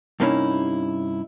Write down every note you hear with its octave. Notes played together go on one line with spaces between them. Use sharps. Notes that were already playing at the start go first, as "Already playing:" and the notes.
G2 C3 A#3 C#4 D#4 E4